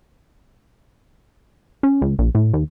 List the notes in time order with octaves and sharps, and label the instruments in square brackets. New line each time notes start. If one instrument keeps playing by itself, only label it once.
[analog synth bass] C#4
C#2
A#1
A2
D#2